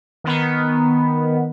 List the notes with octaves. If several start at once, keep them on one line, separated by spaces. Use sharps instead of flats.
D#3 B3